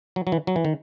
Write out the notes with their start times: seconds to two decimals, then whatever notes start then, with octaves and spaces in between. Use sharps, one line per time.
0.16 F#3
0.27 F#3
0.32 E3
0.47 F#3
0.56 E3
0.65 D#3